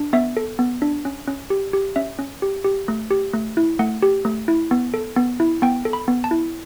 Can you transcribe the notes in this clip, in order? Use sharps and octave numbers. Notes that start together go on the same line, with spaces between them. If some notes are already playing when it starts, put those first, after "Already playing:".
Already playing: D4
B3 E5
A4
B3
D4
C#4
C#4
G4
G4
C#4 E5
C#4
G4
G4
A3
G4
A3
E4
A3 F#5
G4
A3
E4
B3
A4
B3
E4
B3 G5
A4
B5
B3
A5
E4